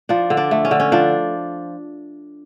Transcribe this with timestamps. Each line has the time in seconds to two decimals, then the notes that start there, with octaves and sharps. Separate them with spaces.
0.09 F3 D4
0.30 D3
0.37 D4
0.51 A3
0.65 C#4
0.71 D3
0.80 C#4
0.92 F3 D4